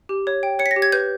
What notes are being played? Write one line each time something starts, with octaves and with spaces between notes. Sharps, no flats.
G4
C#5
G5
C#5 C#7
B6
A#6
G4
G#6
B4 G6